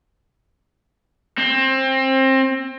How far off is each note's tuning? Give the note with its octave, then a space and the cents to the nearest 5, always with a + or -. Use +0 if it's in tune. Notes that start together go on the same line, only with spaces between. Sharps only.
C4 +25